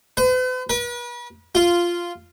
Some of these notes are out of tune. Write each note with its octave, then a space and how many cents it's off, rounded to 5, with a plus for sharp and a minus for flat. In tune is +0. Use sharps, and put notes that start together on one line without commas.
B4 +45
B4 -40
F4 -5